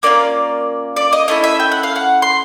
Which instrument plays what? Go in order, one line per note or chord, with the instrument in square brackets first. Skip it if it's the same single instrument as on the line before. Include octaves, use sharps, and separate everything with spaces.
[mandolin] A#3 C#4 F4 D5
D5
D#5
A3 C#4 E4 D#5
E5
G5
F#5
F5
F#5
C6